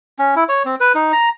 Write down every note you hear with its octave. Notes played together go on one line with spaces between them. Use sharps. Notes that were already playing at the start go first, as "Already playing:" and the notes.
C#4
E4
C#5
C4
B4
D#4
A#5